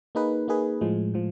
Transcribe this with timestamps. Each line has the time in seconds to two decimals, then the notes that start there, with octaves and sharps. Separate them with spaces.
0.15 A#3 D#4 G#4 B4
0.48 A#3 D#4 G#4 B4
0.81 A2 F3 G#3
1.14 A2 F3